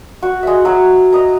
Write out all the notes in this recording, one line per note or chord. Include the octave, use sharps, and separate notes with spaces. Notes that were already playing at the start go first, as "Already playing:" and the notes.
F#4
G#3 E5
F#3 F5
D#5 A#5